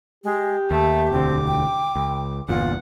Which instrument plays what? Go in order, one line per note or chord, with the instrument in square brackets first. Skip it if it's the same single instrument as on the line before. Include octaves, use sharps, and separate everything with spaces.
[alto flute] G#3 [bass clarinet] G4
[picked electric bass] D#2 [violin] A3 [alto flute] E5
[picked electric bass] E1 D2 D3 [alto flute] C4 [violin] D6
[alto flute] G5
[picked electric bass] C#2
[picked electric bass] G1 E2 A#2 [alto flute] F4 [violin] F#5